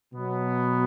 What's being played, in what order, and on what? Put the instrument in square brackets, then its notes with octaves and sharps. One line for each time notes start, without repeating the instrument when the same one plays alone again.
[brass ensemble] B2 F#3 B3